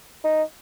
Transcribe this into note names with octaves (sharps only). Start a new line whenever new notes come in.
D#4